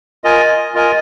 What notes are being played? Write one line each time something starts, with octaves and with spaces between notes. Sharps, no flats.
F4 A#4 D#5 G#5
F4 A#4 D#5 G#5